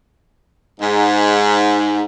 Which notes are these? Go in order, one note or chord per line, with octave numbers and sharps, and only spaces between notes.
G#2